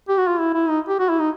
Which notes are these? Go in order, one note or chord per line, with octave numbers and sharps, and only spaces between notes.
G4
F#4
F4
E4
E4
D#4
G4
F#4
E4
D#4